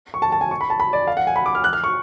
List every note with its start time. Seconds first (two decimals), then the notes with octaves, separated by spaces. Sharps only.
0.14 C#6
0.22 A5
0.32 A5
0.41 G#5
0.51 C#6
0.61 B5
0.70 A5
0.80 B5
0.93 D5
1.07 F5
1.17 F#5
1.27 G#5
1.36 B5
1.46 D6
1.55 F6
1.64 F#6
1.73 F6
1.84 C#6